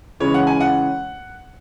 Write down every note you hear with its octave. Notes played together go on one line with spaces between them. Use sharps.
C#3 E3 G#3 C#4 C#5
F#5
G#5
F#5